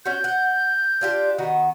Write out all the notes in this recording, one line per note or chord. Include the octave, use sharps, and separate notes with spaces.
C#4 F#4 G6
F#5
D4 F4 G4
D#3 B3 F#4